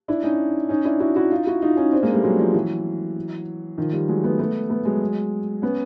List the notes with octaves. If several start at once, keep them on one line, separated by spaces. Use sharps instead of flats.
D4 E4
C#4 D#4
C#4 D#4
D4 E4
E4 F#4
E4 F#4
D#4 F4
E4 F#4
D#4 F4
C#4 D#4
C4 D4
G#3 A#3
G3 A3
F#3 G#3
F3 G3
E3 F#3
D#3 F3
F3 G3
F#3 G#3
A3 B3
A3 B3
A3 B3
F#3 G#3
B3 C#4